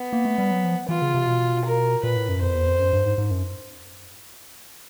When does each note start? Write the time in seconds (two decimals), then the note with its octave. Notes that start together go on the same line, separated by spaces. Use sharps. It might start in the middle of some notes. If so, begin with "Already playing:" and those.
Already playing: B3
0.13 A#3
0.25 A3
0.38 G3
0.51 F#3
0.64 F3
0.88 E3 F4
1.02 C#3
1.14 C3
1.27 B2
1.65 A#4
2.03 A#2 B4
2.16 A2
2.29 F#2
2.41 F2 C5
2.54 E2
2.67 F2
2.80 F#2
2.93 G2
3.06 G#2
3.18 G#2
3.31 F#2